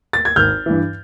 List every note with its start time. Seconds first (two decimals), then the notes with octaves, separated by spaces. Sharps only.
0.13 A6
0.25 G#6
0.36 G#1 F6 G6
0.66 G2 E3